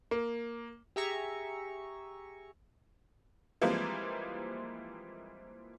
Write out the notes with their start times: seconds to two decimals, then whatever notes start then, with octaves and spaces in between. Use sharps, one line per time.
0.11 A#3
0.96 G4 G#4 E5 G#5 A#5 C#6
3.61 E3 F3 G3 G#3 A#3 C4